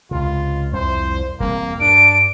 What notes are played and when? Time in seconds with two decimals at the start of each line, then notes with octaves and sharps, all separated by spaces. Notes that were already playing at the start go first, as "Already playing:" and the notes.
0.11 C#2 C3 F4
0.73 C2 F2 C5
1.40 E1 G3 A#3 C4
1.80 G2 D4 D7